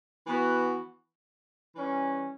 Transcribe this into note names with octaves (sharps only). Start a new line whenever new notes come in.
E3 B3 F#4
E3 G3 C#4